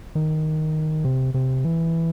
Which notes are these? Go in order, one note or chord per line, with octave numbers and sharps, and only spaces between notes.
D#3
C3
C3
E3